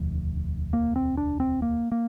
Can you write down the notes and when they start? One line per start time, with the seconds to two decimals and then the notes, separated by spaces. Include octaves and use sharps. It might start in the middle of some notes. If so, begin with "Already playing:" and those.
Already playing: E1 D2 F3
0.73 A#3
0.96 C4
1.17 D4
1.40 C4
1.62 A#3
1.92 A#3